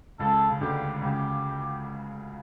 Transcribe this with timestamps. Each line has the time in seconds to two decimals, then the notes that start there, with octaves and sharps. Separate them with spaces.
0.19 C#2 C#3 A4
0.50 C#3
0.61 D2 D3 G4
1.02 C#2 C#3 G4